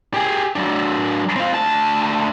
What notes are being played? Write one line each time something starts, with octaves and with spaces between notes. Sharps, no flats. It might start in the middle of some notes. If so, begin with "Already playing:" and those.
G4 G#4
F#3 D4
C4 F4
D2 A5